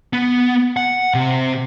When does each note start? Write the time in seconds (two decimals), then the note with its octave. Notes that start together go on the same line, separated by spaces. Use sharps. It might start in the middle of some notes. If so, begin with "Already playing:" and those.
0.13 B3
0.77 F#5
1.14 C3